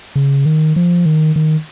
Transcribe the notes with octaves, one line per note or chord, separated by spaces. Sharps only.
C#3
D#3
F3
D#3
D#3